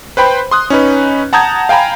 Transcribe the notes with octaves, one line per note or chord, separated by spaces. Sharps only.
B4 C5 G5 B5
C6 D#6 F#6
C#4 D#4 B4
F#5 A5 A#5 D#6 G6 G#6
F5 G5 G#5 A#5 B5